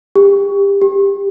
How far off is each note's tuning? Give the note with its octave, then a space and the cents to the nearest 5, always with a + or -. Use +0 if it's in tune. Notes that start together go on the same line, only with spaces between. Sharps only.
G4 +25
G4 +10